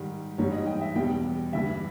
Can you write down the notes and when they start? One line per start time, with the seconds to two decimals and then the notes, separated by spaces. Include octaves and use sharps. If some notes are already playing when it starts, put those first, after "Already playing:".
Already playing: G#2 D#3 G3
0.38 G#2 E3 G3 C#5
0.52 D#5
0.67 G5
0.81 E5
0.95 E2 B2 G3 G5
1.53 G2 E3 G3 E5